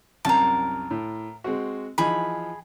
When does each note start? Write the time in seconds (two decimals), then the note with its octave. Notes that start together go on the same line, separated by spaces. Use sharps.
0.25 C2 F#2 C3 A#4 A5
0.91 A2
1.44 G#3 C4 F#4
1.98 E3 F3 D#4 G#4 B5